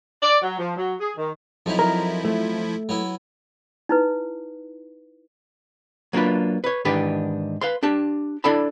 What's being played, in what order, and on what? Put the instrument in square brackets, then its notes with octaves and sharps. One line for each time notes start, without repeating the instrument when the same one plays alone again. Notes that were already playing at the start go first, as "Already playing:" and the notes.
[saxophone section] D5
F#3
F3
F#3
G#4
D#3
[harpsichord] F2 F#3 D#4 [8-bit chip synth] F3 E4
[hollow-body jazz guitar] A#4
A3
[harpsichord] F#3 B3 E4
[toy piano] D#4 E4 B4
[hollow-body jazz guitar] F#3 A#3 D4 F4 B4
B4 C#5
G#2 D#3 E3 D4 G4 B4
B4 F5 C6
D4 G4 A5
D4 E4 A4 D5 A5 B5